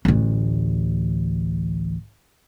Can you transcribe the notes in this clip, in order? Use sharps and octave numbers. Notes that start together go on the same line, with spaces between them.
A1 D2